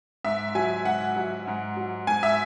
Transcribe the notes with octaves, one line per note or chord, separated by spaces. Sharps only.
G#2 E5
F#3 G#5
G#2 F#5
F#3
G#2
F#3
G#2 G#5
E5